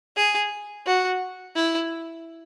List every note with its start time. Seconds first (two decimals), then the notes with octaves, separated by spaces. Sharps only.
0.16 G#4
0.86 F#4
1.56 E4